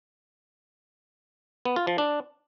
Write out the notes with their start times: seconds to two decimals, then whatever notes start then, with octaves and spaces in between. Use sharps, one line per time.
1.65 B3
1.76 F4
1.87 F3
1.98 D4